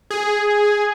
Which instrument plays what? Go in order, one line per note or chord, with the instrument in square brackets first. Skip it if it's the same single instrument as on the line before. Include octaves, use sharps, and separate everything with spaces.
[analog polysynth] G#4